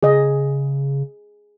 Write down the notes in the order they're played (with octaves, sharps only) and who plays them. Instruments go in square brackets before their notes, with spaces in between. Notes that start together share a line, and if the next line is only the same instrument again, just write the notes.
[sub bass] C#3 [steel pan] G#4 D#5